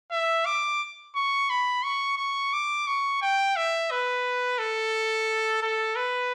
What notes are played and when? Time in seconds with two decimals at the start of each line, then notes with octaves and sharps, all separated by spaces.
0.12 E5
0.46 D6
1.16 C#6
1.50 B5
1.83 C#6
2.18 C#6
2.53 D6
2.87 C#6
3.22 G5
3.57 E5
3.91 B4
4.59 A4
5.62 A4
5.96 B4